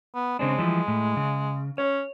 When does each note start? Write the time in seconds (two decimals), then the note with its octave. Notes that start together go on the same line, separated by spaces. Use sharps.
0.15 B3
0.39 C#3 G#3 C4 D4
0.58 E3 F3 G3
0.88 A2
1.17 C#3
1.78 C#4 C#5